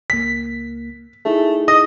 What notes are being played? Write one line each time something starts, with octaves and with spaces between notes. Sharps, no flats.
C#2 A#3 B6
A3 D#4 E4 G#4
D#5 D#6